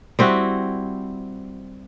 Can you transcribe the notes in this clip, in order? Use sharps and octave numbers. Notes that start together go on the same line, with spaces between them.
G3 C4 E4 F#4